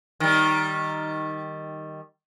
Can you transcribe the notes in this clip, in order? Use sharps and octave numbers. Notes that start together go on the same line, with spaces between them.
D#3 G3